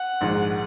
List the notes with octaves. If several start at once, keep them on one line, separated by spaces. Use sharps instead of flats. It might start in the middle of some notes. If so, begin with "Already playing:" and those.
Already playing: F#5
A#1 G#2 D#3 G#3